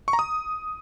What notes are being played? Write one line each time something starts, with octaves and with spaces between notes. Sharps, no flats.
C#6
A#5
D#6